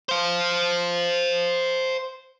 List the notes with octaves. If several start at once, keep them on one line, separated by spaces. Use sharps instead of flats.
C5 F5